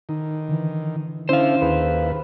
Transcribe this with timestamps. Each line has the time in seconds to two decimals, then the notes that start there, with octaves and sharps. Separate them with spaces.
0.09 D#3 D#4
0.48 D3 E3
1.29 D3 C#4 E4 C5 F5
1.62 D#2 G#4 B4